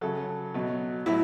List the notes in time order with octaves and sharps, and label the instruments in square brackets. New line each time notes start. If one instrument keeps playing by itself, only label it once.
[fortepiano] C#3 F#3 A4
B2 F#3
A2 F#3 E4